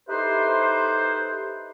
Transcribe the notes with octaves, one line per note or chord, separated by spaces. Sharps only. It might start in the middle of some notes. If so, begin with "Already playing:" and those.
D#4 E4 G4 A4 B4 C5